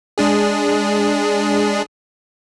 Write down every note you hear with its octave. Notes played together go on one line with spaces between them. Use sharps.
G#3 D4 G#4